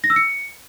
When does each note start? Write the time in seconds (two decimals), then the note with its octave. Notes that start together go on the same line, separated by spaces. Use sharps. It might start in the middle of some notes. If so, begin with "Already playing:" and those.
0.04 A#6
0.10 E6
0.16 C#7